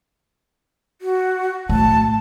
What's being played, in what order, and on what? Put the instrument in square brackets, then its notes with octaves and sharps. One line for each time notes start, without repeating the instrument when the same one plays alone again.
[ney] F#4
[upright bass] A2 [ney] A5